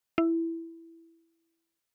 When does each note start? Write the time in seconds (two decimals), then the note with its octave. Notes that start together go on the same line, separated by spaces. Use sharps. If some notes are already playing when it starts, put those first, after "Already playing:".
0.18 E4